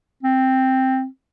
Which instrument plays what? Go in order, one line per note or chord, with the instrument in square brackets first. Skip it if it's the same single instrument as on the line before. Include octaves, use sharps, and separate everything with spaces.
[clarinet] C4